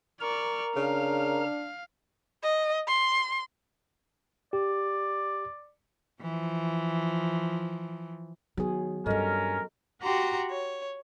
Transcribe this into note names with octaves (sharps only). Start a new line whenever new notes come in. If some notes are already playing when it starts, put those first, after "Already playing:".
A#4 D5 A#5 C#6
C#3 D4 F5
D#5
C6
G4 D5
E3 F3
D#3 F#3 B3 G#4
G2 E3 C#4 A4 A#4 D#5
F#4 G4 F#5 A#5 C6
C#5